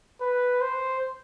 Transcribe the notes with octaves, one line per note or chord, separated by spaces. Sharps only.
B4
C5